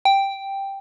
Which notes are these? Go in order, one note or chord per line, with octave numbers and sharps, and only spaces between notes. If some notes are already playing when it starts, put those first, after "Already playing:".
G5